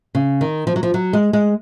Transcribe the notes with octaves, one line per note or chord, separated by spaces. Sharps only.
C#3
D#3
F3
F#3
F3
F#3
G#3
G#3